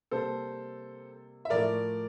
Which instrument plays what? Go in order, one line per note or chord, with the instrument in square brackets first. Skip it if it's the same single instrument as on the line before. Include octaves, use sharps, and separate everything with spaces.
[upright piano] C3 G3 A#3 A4 C5
E5
A2 F3 A3 A#4 D5